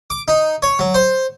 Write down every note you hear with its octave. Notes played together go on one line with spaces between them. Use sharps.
D6
D#4
C#5
F#3
C5